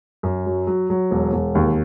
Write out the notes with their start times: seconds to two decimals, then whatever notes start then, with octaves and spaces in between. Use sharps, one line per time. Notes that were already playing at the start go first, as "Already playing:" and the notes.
0.23 F#2
0.46 F#3
0.67 F#3
0.90 F#3
1.11 E1
1.33 E1
1.55 D#2